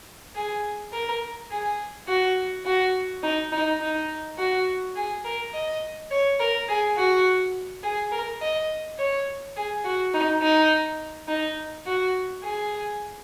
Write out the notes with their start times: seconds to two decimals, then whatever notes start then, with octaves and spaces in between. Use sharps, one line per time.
0.35 G#4
0.93 A#4
1.51 G#4
2.08 F#4
2.66 F#4
3.23 D#4
3.52 D#4
3.81 D#4
4.38 F#4
4.96 G#4
5.25 A#4
5.54 D#5
6.11 C#5
6.40 A#4
6.69 G#4
6.97 F#4
7.83 G#4
8.12 A#4
8.42 D#5
8.98 C#5
9.56 G#4
9.85 F#4
10.14 D#4
10.42 D#4
11.28 D#4
11.87 F#4
12.43 G#4